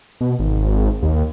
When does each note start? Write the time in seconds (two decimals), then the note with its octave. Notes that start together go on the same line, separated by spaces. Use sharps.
0.21 B2
0.39 G#1
1.03 D#2